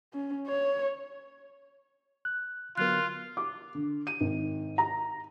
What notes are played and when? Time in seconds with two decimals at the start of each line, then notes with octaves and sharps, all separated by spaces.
0.14 C#4
0.48 C#5
2.25 F#6
2.77 D3 F#3 B3 F4 A#4 F#6
3.37 D6
3.75 D3
4.07 D#7
4.20 G#1
4.78 A#5